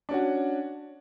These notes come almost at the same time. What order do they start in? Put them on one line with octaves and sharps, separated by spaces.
D4 C#4 F#4